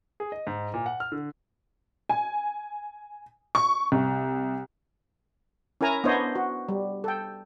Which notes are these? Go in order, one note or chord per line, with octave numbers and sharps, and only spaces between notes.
G#4
D#5
G#2
A#2
F#5
F6
D3
G#5
C#6
C2
C#4 E4 A#4 G#5 A#5
B3 D4 E4 C5 C#5 D#5
F#4
G3
A4 G5